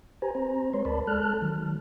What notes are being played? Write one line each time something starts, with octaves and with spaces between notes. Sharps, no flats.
G4 B4 C5 G#5 A#5
C4 C5 A#5
G#3 B4 C#5 C6
D2 A#4 D5 A5 B5
G#3 A4 A5 F6 F#6
D#3 F#3